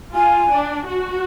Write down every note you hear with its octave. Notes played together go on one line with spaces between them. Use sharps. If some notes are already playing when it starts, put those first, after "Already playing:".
F4 G#5
D4
F#4